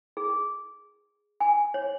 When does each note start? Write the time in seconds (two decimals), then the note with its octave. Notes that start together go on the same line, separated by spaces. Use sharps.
0.17 G#4
1.40 G#5
1.74 C#5